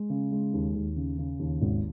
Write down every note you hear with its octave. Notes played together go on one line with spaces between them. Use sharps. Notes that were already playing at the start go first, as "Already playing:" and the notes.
Already playing: G#3
C#3
G#3
D#2
D#2
C#3
C#3
D#2
G#1